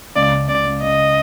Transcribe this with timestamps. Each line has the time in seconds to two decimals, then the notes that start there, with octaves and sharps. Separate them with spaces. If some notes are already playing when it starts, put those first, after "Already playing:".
0.16 C#2 D5
0.33 C#2
0.49 C#2 D5
0.65 C#2
0.82 C#2 D#5